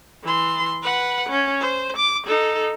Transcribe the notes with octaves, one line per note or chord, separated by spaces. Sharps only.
E3 C6
B4 F#5
C#4
C5
D6
D#4 A4